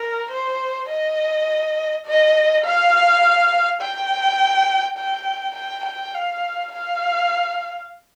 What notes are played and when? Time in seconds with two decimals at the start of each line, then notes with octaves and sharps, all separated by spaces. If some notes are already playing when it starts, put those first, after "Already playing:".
Already playing: A#4
0.32 C5
0.90 D#5
2.06 D#5
2.65 F5
3.81 G5
4.98 G5
5.56 G5
5.85 G5
6.15 F5
6.72 F5